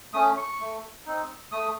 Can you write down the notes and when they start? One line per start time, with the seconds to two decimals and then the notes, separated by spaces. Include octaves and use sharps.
0.13 A3 C#4 D#6
0.37 C#6
0.60 A3
1.06 C4 D#4
1.52 A3 D#6